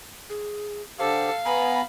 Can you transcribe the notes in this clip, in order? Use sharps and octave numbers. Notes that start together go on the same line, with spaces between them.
G#4
D3 G4 A4 C5 F5
B3 G#5 A#5 B5